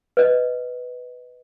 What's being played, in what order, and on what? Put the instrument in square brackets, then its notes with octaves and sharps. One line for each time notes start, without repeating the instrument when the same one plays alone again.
[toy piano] B4 D#5